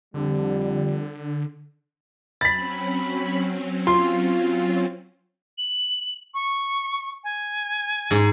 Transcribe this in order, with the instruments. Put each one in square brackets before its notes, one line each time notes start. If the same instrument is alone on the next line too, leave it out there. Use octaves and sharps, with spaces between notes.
[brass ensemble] F2 G3 [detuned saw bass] D3
[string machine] F#3 C4 C#4 [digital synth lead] B5 [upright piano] A6 B6
[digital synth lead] F4 [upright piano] C6
[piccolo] F#7
C#6
G#5
[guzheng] G#2